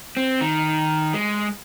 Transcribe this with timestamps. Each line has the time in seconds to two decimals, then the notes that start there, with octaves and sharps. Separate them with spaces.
0.17 C4
0.41 D#3
1.13 G#3